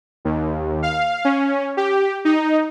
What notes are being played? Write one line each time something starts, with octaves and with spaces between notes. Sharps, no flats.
D#2
F5
C#4
G4
D#4